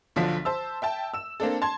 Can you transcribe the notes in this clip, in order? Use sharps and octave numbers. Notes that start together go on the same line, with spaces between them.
B1 D3 F3 D4 B6
C5 A5 E6
E5 G5 A5
E6 E7
A#3 C4 D4 A4
A5 C6 G#6